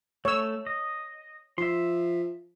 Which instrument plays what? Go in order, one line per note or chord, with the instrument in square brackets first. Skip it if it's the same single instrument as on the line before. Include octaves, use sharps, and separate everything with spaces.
[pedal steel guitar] A3 [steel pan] C#5 E6
[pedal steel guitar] D#5
[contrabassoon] F3 [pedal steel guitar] E5 C6